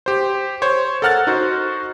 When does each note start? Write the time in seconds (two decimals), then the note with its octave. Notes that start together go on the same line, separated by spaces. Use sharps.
0.06 G4 C5
0.62 C5 C#5
1.02 A4 A#4 F#5 F6 F#6 A6
1.27 D#4 F#4 C5